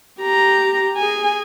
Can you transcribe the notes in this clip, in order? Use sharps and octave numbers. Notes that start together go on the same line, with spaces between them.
G4 A#5
G#4 G#5